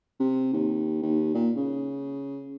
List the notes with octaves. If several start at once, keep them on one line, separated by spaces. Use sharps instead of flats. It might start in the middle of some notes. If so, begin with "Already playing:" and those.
C3
D#2
D#2
A#2
C#3